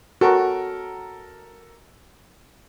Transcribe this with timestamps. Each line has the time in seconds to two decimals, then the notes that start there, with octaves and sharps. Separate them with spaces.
0.21 F#4 A4 A#4